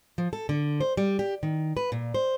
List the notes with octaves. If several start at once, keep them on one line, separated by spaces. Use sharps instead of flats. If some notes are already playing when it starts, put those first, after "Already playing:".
F3
A4
D3
C5
G3
G4
D#3
B4
A#2
C5